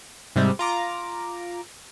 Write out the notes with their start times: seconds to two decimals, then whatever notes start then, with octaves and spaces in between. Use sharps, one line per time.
0.36 G#2 C3 G3
0.59 F4 A#5 D6